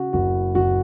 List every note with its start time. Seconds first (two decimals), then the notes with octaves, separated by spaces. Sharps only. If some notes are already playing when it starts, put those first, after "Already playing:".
Already playing: C#3 F#4
0.13 F#1 F#4
0.55 F#1 F#4